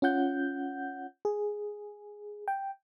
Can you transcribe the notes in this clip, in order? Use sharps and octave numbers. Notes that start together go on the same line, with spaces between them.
C#4 F4 F#5 G6
G#4
G5